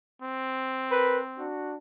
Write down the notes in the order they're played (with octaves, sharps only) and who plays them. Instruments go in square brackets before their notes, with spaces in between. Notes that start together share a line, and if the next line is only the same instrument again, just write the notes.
[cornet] C4
[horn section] A#4 B4
D4 F#4